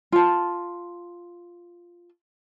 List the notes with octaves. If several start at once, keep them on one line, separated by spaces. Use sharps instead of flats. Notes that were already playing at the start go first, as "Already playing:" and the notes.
F4 A5